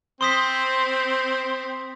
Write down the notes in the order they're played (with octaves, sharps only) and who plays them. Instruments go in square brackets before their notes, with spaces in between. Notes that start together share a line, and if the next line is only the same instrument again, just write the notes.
[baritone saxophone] C4 [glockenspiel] C6 D#6 B6